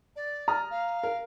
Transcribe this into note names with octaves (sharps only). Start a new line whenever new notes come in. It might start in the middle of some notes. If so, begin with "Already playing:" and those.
D5
A#5 D#6 F6
F5
A#4